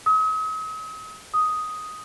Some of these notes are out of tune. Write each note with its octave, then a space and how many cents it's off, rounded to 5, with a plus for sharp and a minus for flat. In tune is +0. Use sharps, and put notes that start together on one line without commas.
D#6 +40
D#6 +5